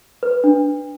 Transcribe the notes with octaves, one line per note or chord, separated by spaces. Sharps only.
B4
D4